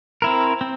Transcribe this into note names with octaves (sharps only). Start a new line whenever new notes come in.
C4 E4 A#4
C4